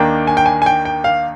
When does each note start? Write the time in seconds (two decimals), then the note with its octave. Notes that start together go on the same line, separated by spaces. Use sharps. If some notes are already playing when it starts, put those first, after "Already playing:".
Already playing: D#2 D#3 A#3 D4 G5
0.27 G#5
0.37 G5
0.46 G#5
0.62 G#5
0.66 G5
0.85 G5
1.04 F5